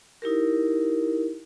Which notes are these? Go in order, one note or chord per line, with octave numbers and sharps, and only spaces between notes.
D#4 E4 G4 A#4